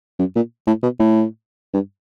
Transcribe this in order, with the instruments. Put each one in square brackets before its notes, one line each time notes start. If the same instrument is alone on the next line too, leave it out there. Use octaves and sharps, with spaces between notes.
[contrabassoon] F#2
A#2
A2
B2
A2
G2